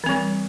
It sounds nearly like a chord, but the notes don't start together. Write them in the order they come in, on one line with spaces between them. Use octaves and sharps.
E3 C4 G3